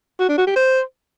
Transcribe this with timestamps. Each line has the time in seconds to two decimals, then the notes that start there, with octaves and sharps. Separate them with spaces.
0.20 F#4
0.29 D4
0.38 F#4
0.47 G4
0.56 C5